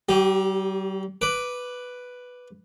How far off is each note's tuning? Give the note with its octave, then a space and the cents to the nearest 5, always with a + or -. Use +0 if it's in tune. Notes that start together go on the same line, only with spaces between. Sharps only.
G3 -45 G4 +0
B4 +0 D6 +0